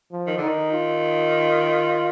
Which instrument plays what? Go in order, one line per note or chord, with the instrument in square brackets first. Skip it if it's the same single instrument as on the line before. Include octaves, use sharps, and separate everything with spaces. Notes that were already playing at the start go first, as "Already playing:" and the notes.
[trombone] F3
[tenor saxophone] D#3
[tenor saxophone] D3 [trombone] D#4
[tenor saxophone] D#3
[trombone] F4